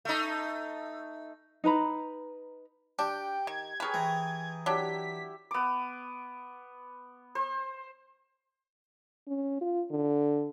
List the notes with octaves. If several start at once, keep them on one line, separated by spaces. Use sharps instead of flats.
A3 D#4
D#4 B4 A#5 B5
D4 G4 G5
D#3 G#6
G#4 A#4 B4 C#5 G5
E3 C5 G#5 A#5
F#3 D4 E4 G4 B6
B3 D6
C5
C#4
F4
D3